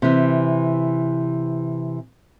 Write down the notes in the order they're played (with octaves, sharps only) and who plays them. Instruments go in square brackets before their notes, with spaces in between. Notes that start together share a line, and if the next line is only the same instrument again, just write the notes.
[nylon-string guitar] C3 E3